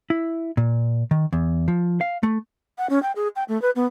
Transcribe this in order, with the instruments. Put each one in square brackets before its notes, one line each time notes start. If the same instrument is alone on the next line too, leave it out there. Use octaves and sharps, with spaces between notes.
[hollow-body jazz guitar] E4
A#2
D#3
E2
F3
F5
A3
[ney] F#5
C#4
G5
G#4
G5
A3
B4
B3